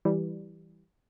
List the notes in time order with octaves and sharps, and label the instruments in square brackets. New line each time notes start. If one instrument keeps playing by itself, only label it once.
[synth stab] E3 G3